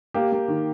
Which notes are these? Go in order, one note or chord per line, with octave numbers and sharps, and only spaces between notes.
A#3 G4
A#3
D#3